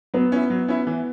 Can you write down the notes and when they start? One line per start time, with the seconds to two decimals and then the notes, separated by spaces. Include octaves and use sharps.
0.14 F#3 B3
0.32 C#4 E4
0.50 F#3
0.68 C#4 E4
0.87 E3